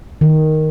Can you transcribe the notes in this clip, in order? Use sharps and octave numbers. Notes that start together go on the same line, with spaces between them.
D#3